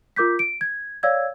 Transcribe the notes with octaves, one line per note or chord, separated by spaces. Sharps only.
F4 A#4 D6 G6 B6
D7
G#6
C#5 D5 F5 E6 G#6